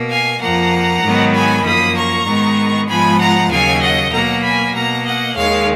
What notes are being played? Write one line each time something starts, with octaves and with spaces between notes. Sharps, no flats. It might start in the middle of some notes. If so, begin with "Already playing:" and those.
Already playing: B2 A#3
F5 G#5
F2 F3 A#3 F#5 A#5
G#2 D#3 F#3 B3
G#5 B5
F#2 F3 A#3 B5 D#6
A#5 C#6
G#2 D#3 G#3 B3
G#2 F3 G#3 B3 G#5 B5
F#5 A#5
D#2 C#3 F#3 F5 G#5
D#5 F#5
B2 F#3 A#3 F#5 A#5
G#5 B5
B2 A#3 F#5 A#5
D#5 F#5
D#2 D#3 G#3 C#5 F5